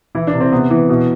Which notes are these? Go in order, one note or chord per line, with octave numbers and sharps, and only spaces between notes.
E3 E4
D4
C3
C4
C3 B3
E3
B2